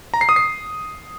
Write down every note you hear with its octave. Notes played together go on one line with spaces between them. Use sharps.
A#5
C7
D#6
C7